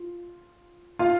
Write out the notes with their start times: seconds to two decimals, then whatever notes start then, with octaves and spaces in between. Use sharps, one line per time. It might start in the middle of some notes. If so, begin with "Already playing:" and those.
Already playing: F4
0.99 F4 F5